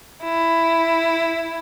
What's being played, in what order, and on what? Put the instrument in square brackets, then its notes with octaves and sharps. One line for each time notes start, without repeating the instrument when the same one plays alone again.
[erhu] E4